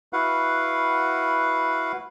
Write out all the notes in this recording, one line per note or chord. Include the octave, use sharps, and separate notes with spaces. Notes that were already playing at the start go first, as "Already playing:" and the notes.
E4 F#4 B4 F5 F#5